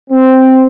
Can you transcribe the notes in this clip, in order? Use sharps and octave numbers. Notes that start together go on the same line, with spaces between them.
C4